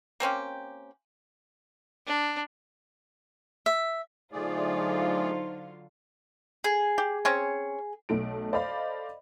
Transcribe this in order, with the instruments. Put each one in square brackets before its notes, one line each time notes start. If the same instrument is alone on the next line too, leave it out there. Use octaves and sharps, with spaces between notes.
[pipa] A#3 C4 C#4 G4
[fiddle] D4
[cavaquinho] E5
[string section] D3 F#3 F4 [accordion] A3 G#4 D5 [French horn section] D#4 C5
[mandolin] G#4
[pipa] G4
C4 C#4 C#5
[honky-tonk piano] B1 A3 A4 D7
A4 C5 D5 D#5 F5 B5